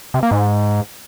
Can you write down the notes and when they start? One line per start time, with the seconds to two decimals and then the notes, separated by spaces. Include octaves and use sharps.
0.14 C3
0.23 A#3
0.31 G#2